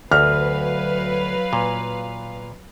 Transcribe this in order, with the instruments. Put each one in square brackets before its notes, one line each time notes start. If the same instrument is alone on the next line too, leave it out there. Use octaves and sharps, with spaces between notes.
[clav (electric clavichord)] D2 [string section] F#3 B4 F5 [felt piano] F6
[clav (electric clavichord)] A#2